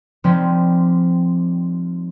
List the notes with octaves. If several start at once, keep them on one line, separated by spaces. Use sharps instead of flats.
F3 G3 G#3 C4 D#4